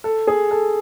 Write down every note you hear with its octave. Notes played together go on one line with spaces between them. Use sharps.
A4
G#4
A4